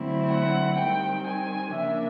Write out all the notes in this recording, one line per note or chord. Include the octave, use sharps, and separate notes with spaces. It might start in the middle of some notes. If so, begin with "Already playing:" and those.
Already playing: D3 F#3 A3 C4 E4
F#5
D#3 G3 C4 G5
G#5
C#3 F3 A#3 D4 E5